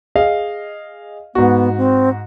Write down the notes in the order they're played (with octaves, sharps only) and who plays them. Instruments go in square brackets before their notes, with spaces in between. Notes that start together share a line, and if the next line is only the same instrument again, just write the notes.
[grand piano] G#4 D#5 F5
[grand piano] G#2 F#4 [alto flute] B3
[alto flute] C4